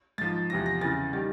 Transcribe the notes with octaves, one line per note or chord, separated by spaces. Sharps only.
G#2 F3 A6
E2 C3 F3 A#6
A#6
E2 C#3 E3 A6
D#3 G3 A6